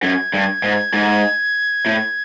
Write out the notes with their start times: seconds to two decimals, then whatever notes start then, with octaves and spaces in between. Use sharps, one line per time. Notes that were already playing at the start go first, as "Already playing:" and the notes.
0.03 F#2 G#6
0.33 G2
0.63 G#2
0.94 G#2
1.86 A2